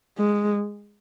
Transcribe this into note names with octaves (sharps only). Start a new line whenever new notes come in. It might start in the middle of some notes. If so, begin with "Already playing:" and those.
G#3